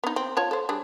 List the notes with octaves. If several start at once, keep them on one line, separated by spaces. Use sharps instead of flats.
B3 D#4
C4
F4 C#5 A5
A4 C5
G3 D4 G#4